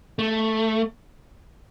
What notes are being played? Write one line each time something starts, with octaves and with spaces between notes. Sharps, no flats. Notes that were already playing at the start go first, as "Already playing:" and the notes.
A3